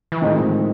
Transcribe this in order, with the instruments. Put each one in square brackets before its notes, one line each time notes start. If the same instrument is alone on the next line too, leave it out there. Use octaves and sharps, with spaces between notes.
[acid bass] E3
[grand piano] A2 F3 G#3 C4 D#4 [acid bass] D#3